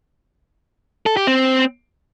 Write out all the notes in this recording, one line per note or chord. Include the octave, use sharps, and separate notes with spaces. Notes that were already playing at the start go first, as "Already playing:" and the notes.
A4
G4
C4